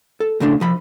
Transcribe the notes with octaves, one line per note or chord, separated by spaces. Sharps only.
A4
A2 C#3 A3 D4
C2 F3 B5